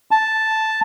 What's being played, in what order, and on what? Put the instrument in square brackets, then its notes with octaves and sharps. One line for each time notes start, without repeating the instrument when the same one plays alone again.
[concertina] A5